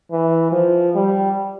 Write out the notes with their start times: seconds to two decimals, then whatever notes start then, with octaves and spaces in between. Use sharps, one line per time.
0.11 E3
0.52 F3
0.95 G3